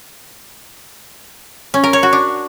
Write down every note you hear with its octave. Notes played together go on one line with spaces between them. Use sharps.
C#4
A#4
C#5
F#4
D4